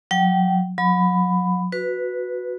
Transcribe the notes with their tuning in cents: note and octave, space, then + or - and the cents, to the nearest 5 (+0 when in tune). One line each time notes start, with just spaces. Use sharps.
F#3 -25 G5 -25
F#3 -35 B5 +15
F#4 -15 B4 +0